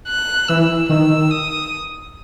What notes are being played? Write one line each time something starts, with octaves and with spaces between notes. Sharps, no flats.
F#6
E3 E6
D#3 E6
D#6